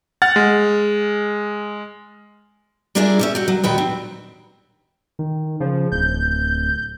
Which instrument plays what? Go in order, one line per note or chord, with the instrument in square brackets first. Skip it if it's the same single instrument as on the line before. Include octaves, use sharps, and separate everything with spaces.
[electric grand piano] F#5 F6 A6
G#3
[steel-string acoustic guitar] G3 A#3 D4 F4 G#4 E5
G3 C#4 E5
F#4 G4
F#3
D#2 A#2 F#4 G4 B4 G5
C4
[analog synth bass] D#3
[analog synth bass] C#3 [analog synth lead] F3
[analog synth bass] D1 [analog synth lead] G6